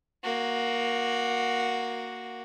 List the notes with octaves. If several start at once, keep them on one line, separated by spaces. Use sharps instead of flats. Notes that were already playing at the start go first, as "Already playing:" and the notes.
A#3 F#4